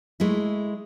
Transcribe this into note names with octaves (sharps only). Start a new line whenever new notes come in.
G#3 A3 E4